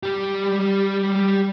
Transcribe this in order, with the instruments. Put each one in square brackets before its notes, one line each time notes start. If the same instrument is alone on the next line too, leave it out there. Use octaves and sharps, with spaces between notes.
[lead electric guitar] G3 G4